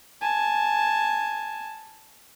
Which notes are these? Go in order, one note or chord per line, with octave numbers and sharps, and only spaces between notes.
G#5 A5